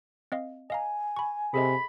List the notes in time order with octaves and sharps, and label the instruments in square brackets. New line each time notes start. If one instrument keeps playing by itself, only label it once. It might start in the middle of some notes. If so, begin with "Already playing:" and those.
[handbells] C4 D#5 F5
[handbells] D#5 F5 A#5 [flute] G#5
[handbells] B5 C#6
[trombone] C3 [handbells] G#4 A4 D#5 [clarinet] B5